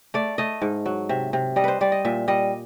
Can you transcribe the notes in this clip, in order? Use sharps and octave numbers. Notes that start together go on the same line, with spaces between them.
A3 D5
A3 D#5
G#2
F#3
C3 E5
C3
G3 D#5
B4 C5
G3 D5
D#5
A#2 E5
G3 D#5